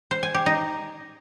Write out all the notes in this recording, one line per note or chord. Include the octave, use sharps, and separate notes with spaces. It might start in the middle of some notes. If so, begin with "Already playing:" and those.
C5
G#5
G4
D#4